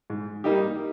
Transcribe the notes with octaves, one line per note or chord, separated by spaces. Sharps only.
G#2
G3 A#3 D#4 G4